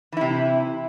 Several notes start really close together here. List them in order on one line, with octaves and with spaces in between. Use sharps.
E3 E4 C3